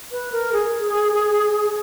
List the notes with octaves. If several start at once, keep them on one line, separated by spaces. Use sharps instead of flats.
B4
A#4
G#4